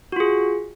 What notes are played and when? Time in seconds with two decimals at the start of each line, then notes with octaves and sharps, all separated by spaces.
0.12 F#4
0.16 F4
0.20 G#4